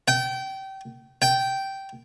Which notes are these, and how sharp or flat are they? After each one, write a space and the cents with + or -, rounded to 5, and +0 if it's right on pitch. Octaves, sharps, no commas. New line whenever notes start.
G5 -25
G5 -10